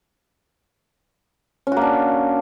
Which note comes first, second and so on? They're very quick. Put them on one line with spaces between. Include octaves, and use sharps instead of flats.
C#4 F#4 A#3 D4